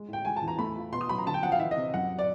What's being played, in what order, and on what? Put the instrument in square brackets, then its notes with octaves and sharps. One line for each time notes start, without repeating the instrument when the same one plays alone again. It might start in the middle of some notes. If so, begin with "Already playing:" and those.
Already playing: [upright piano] G#3
A2 G5
G#3 G#5
A5
E2
A#5
A3 B5
F4
B2 C6
D#6
F#3 B5
A#5
D3 A5
G5
F3 F#5
F5
E3 E5
D#5
C3
F#2 F#5
D5